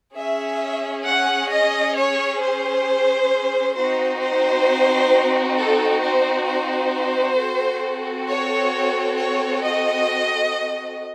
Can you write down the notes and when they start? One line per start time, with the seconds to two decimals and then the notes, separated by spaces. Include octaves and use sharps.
0.15 C#4 G#4 E5
1.05 F#5
1.50 D#5
1.96 C#5
2.41 C5
3.76 C4 D#4 F#4 C5
4.21 C5
5.57 A4
6.03 C5
6.47 C5
7.37 C4 F#4 A4
8.28 C#5
9.17 C#5
9.63 D#5